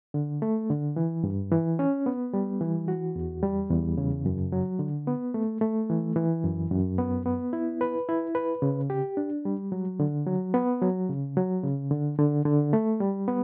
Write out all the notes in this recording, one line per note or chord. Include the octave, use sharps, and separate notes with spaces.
D3
A3
D3
E3
G2
E3
C#4
B3
G3
E3
F#4
E2
G3
E2
C#3
F#2
F#3
D3
B3
A3
A3
E3
E3
F#2
F#2
B3
B3
E4
B4
E4
B4
C#3
G4
D4
G3
F#3
D3
F#3
B3
F#3
C#3
F#3
C#3
D3
D3
D3
A3
G3
B3